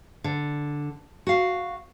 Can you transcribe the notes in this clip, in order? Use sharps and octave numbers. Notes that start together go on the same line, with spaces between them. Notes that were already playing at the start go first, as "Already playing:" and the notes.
D3
F#4 F5